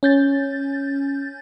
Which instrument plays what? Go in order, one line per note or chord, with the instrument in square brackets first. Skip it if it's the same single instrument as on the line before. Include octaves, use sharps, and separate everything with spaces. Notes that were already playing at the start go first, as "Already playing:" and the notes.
[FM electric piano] C#4 G6 A6